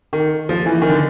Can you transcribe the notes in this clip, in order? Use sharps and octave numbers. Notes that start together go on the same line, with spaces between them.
D#3
F3
E3
D#3
D3